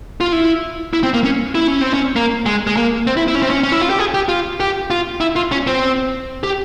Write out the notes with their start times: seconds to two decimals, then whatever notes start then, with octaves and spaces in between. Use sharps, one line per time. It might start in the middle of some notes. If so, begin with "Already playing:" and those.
0.20 F4
0.32 E4
0.93 E4
1.03 C4
1.14 A#3
1.24 C#4
1.55 E4
1.67 C#4
1.81 C4
1.94 C#4
2.16 A#3
2.46 G#3
2.67 G#3
2.77 A#3
3.07 C4
3.17 E4
3.28 E4
3.35 C#4
3.42 C4
3.50 C#4
3.63 C#4
3.72 E4
3.82 F4
3.90 G4
3.99 G#4
4.14 G4
4.29 F4
4.60 G4
4.90 F4
5.20 E4
5.36 F4
5.52 C#4
5.67 C4
6.43 G4